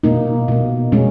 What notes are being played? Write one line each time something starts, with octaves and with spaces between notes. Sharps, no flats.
B2 A#3 D#4
B2 A#3
B2 G#3 C#4